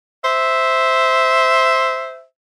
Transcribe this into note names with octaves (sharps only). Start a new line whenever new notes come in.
C5 E5